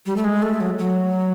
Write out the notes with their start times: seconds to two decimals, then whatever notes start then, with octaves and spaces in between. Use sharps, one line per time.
0.06 G3
0.16 A3
0.24 G#3
0.42 A3
0.60 F#3
0.79 F#3